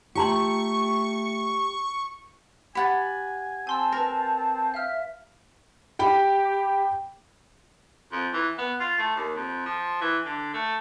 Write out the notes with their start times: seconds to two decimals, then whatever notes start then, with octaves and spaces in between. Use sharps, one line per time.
0.15 A3 F4 G4 A#5 C6 C#6
2.75 G4 F#5 G#5 B5 A6
3.67 C4 G#5 A5 C6 E6
3.92 A#4 B4 A#6
4.74 E5 F5 F6
5.99 G4 G5 B5
8.12 F2
8.33 E3
8.58 B3
8.80 F4
8.99 A3
9.16 D#2
9.35 F2
9.66 F3
10.01 E3
10.25 D3
10.54 A3